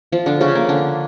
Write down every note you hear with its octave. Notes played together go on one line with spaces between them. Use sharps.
F3 F4
D3 D4
C#3 C#4
A#3
D3 D4